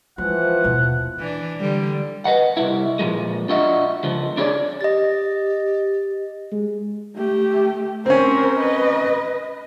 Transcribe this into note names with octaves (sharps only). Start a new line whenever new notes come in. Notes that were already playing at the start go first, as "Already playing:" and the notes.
E3 F3 G#3 F#5
D#2 B2
E3 D4
D3 G3
B4 D#5 F#5
C2 G2 E4
A#2 F3 G#3
D4 F4 F#4 D#5 E5
C#2 F3
D4 E4 G#4 B4 C#5 D5
G4 D#5 A6
G#3
A3 G4
C4 C#4 A#4 C5
B4 D#5